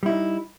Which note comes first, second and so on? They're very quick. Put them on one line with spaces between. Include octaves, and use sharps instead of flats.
G3 E4 D#4